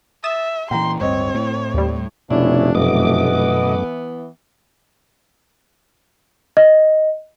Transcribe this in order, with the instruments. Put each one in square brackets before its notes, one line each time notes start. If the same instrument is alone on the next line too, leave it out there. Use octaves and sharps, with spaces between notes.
[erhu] E5 [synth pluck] D#6 A6 E7
[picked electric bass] A#2 E3 [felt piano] G5 A#5 [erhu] C6
[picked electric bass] D1 G2 [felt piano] C4 D#5 [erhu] C#5
[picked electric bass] A2
[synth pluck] D#2 G3
[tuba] F1 [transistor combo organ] B2 C#4 E4 [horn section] D4
[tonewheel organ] F#2 A3 D6 [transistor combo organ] B2 D#5 [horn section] E3 B3
[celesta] D#5